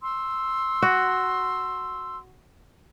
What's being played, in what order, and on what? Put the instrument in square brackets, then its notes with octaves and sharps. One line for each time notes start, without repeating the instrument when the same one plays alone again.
[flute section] C6 E6
[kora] F#4